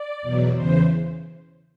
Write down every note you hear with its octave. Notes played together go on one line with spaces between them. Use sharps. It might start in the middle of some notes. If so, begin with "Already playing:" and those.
Already playing: D5
E2 B2 F#3
E2 C#3 E3 C5